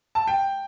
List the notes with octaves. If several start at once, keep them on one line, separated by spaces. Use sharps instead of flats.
A5
G5